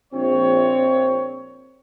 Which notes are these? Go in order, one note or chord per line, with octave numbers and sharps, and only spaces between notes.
A#1 C4 C#5